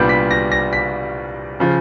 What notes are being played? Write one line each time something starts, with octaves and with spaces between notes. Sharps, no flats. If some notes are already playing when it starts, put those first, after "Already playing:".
Already playing: C2 A#2 G3 B3 D4 G6
B6
A#6
A#6
B6
C#3 F3